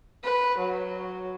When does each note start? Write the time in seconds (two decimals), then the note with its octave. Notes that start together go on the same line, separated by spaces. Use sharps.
0.24 B4
0.58 F#3